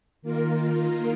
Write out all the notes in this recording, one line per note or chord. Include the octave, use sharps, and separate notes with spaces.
D#3 A#3 F4 A#4